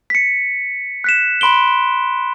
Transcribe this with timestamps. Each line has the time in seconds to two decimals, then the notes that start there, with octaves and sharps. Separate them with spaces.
0.10 B6 C#7
1.04 F#6 B6 E7
1.41 B5 C6 D7 G7